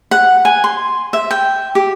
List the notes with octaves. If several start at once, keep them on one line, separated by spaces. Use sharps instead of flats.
F#5
G#5
C6
E5
G5
G4